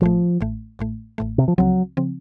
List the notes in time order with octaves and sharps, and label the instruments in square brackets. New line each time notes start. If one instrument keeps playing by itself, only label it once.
[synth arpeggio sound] A1 A2 A3 [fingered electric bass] F3
[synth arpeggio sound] A1 A2 A3
A1 A2 A3
A1 A2 A3
[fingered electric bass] C3
F3
[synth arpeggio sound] C#2 C#3 F3 C4 [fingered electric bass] F#3
[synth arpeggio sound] C#3 F3 C4